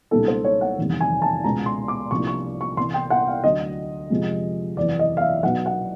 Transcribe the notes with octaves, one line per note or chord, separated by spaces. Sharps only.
C#2 B2 G3 A#3 D#4 A4
C5
C#5
F#5
F1 E2 C3 D#3 G3
G#5
A5
C#2 B2 G#3 A#5
C6
D6
C2 C3 F3 A#3 D4 C#6
C#6
C#6
C2 C3 E3 C6
G5
F#5
F5
D2 D3 F#3 D#5
F2 C3 F3 G#3
F#1 E2 C3 E3 D5
D#5
F5
E5
B1 B2 F#3 F#5
F#5